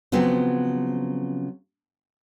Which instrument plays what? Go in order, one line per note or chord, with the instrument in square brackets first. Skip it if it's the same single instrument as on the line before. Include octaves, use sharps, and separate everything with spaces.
[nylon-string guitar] C#3 F3 F#3 B3 C4